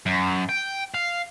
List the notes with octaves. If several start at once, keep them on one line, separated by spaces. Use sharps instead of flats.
F#2
G5
F5